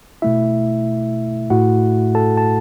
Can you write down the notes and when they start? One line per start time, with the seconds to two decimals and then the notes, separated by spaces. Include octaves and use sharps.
0.22 B2 A3 E4 E5
1.50 A2 A3 E4 F#4 F#5
2.15 A4 A5
2.37 A5